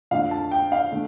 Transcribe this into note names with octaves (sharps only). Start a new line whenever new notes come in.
F2 D3 A3 F5
A5
G5
F5
D3 A3